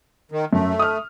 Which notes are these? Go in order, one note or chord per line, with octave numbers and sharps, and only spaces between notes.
D#3
F#2 A3
D#6 F6